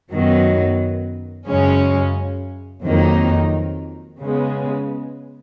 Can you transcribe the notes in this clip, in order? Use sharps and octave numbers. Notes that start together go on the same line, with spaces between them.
F#2 D#3 F#3 B3
F#2 C#3 G#3 C#4
F2 D#3 F#3 A#3 D#4
C#3 G#3 B3